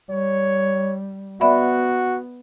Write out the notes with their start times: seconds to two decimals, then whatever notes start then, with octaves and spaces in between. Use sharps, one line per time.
0.10 G3 C#5
1.41 B3 F#4 D5 E5 B5